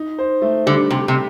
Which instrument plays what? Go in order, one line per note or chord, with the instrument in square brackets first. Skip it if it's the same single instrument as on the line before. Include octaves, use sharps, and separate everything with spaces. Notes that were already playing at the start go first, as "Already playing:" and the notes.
Already playing: [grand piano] D#4
C5
A3
[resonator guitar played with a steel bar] D3 [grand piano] G3
[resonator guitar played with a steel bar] C3 [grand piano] G4
[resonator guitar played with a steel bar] C3